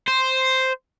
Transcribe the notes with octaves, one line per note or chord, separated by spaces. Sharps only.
C5